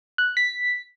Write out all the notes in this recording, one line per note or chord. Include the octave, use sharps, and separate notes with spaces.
F#6
B6